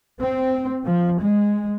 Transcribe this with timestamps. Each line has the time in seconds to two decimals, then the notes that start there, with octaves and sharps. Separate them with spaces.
0.19 C4
0.83 F3
1.21 G#3